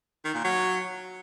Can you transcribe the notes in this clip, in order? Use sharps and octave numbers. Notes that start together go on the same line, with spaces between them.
D#3
A#2
F#3